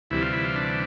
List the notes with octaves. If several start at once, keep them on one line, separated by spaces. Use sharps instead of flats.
D2 C3 E3 G3 E4
F4
E4
F4
D4